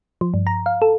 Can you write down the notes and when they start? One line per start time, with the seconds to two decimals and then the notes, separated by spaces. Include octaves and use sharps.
0.21 F3
0.34 G2
0.47 A#5
0.66 F5
0.82 A4